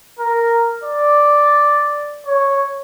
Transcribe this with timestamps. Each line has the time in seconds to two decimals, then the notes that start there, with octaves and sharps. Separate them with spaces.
0.19 A#4
0.83 D5
2.26 C#5